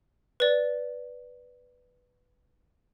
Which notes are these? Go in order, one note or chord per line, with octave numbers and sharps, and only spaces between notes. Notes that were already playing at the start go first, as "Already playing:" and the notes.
B4 D5